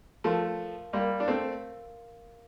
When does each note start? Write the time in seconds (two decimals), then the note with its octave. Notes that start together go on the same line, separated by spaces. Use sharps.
0.24 F3 A3 A#4 F5 C6
0.93 G3 A#3 A#4 F5 C6
1.20 D4
1.28 A3 C4